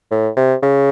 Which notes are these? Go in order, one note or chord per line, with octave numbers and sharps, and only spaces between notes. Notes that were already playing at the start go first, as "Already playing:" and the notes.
A2
C3
C#3